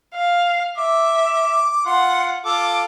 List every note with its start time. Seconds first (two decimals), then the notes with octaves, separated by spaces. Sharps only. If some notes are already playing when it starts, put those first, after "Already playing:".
0.14 F5
0.78 E5 D6
1.86 F4 F#5 C6
2.45 F4 A4 D6